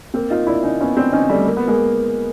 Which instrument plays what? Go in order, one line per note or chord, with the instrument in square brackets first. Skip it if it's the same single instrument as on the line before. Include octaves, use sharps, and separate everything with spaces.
[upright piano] A#3 C4
D#4 F4
D4 E4
C#4 D#4
B3 C#4
C4 D4
C#4 D#4
G3 A3
A#3
B3
G#3 A#3